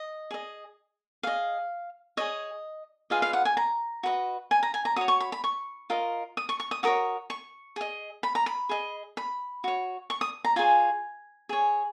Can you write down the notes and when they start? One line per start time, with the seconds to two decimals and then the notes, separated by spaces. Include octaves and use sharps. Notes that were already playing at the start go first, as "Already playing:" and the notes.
Already playing: D#5
0.31 G#4 D#5
1.23 G#4 D#5 F5
2.17 G#4 C#5 D#5
3.10 F4 G#4 B4 D#5 F5
3.22 F5
3.33 F#5
3.45 G#5
3.57 A#5
4.03 F#4 B4 D#5
4.51 G#5
4.63 A#5
4.74 G#5
4.85 A#5
4.96 F#4 C#5 D#6
5.08 C#6
5.20 B5
5.32 B5
5.44 C#6
5.90 F4 A#4 D#5
6.37 D#6
6.49 C#6
6.60 C#6
6.71 D#6
6.83 F#4 A#4 C#5 D#6
7.30 C#6
7.76 G#4 D#5
8.23 B5
8.35 A#5
8.46 B5
8.69 G#4 D#5
9.17 B5
9.64 F#4 C#5
10.10 C#6
10.21 D#6
10.45 A#5
10.56 F4 G#4 C#5 G#5
11.49 G#4 C#5